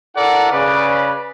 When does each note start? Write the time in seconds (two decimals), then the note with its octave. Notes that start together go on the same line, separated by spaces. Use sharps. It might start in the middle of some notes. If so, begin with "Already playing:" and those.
0.16 E4 A4 A#4 D5 F#5
0.51 C#3 B4 D5